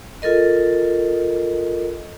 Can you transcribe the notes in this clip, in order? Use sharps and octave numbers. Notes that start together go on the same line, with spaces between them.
F4 A4 A#4 D#5